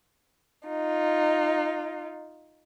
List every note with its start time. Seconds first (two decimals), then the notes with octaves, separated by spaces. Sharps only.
0.67 D#4 F4